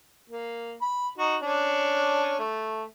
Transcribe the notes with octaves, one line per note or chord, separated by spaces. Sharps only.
A#3
B5
D#4 F#4
C#4 D4
A3